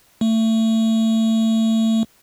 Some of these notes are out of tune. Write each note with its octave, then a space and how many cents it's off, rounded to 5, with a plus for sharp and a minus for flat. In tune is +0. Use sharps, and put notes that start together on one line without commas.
A3 +25